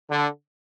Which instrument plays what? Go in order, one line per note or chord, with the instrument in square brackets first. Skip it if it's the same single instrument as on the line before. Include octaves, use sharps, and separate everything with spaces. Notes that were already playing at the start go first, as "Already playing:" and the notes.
[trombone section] D3